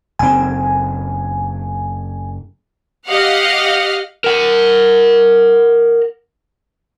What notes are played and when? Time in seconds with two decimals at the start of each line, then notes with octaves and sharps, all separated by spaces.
0.19 F#1 C4 G#5
3.07 G4 D#5 F5 F#5 F6
4.24 A#4 F#5